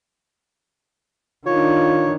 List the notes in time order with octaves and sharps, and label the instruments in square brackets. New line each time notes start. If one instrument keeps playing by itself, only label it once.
[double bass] D#3 D4 [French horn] F4 [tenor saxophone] C#5